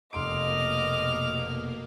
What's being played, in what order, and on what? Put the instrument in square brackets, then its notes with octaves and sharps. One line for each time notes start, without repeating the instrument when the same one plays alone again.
[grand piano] F1 C6 D7 [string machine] B2 A#3 [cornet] D#5 [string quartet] D6 F6